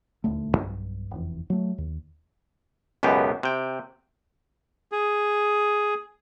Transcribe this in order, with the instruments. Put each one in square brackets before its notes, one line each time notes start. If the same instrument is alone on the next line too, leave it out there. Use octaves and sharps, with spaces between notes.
[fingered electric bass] D#1 D2 A3
B1 G2
F1 E2
F#3 A3
D#2
[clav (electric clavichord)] C#2 F#2 B2 B3 G4
C3 G5
[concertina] G#4